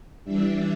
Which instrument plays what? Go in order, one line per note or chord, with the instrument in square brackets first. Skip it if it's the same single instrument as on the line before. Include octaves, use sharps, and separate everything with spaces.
[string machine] E3 G3 D4 E5